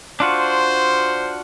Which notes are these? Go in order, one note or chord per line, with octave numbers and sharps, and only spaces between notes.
D4 F4 F#4 C5